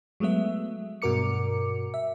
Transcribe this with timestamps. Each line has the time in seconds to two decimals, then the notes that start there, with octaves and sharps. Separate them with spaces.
0.20 F#3 G#3 A3 B3 E5
1.02 G2 B2 F#4 A#4 D6 C#7
1.94 E5